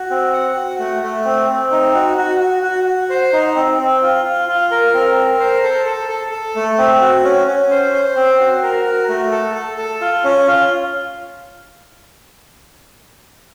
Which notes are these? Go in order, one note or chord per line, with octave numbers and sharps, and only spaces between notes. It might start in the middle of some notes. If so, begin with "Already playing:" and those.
Already playing: F#4
C4
F#5
F#4
A3
A3
C4
C4
D#4
F#4
F#4
F#4
F#4
F#4
C5
D#4
C4
C4
F4
F4
F4
A#4
C4
A#4
C5
A4
A4
A4
A4
A3
C4
F#4
C#4
C#4
C5
C5
C4
F#4
A#4
F#4
A3
A4
A4
A4
F4
C#4
F4